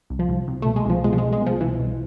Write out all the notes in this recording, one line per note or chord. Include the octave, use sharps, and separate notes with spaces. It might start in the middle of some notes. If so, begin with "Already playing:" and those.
C2
F3
C2
C2
B2 A3
G#3
C2 F3
B2 G#3
F3
C2 G#3
G#3
B2 F3
C2 E3
C2